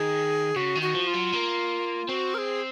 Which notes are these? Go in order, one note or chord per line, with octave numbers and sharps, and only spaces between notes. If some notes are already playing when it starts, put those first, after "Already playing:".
Already playing: D#3 G#4
C#3 F#4
D#3
F#4
F3
F4
F#3
A#3
C4 F#4
A#4
G#4